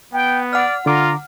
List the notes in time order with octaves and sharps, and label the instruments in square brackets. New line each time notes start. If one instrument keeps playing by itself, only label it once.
[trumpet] B3 [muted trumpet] G5
[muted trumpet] D5 [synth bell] F#5 F6
[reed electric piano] D3 D6 [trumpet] F4 [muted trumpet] A#5